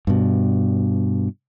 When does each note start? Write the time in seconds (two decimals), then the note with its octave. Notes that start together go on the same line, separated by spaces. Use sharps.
0.07 G2 B2